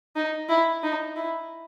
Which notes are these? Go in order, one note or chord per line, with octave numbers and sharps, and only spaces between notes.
D#4
E4
D#4
E4